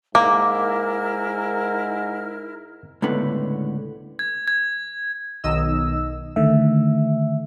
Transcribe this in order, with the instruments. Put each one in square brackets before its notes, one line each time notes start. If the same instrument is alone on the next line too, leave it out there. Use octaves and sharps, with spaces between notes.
[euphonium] G#2 [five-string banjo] A#3 [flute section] E4 A#4 F6 [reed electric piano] D6
[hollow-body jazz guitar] C#2 A2 D3 B3
[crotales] G#6
G#6
[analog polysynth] B1 D#3 D#5 E6
[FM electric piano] D3 D#3 A3 E5